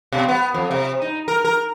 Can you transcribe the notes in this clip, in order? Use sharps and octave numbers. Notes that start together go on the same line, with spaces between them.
B2
B3
F2
C3
D#4
A#4
A#4